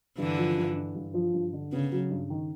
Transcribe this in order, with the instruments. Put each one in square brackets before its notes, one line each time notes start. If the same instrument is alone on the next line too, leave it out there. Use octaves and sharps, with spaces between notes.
[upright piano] G2 [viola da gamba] D3 E3
[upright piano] F3
G2
D3
G2
F3
G2
D3
[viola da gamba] C#3 [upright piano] B3
[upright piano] F#3
G2
D#3